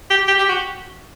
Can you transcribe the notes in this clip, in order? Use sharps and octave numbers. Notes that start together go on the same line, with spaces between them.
G4
G4
G4
F#4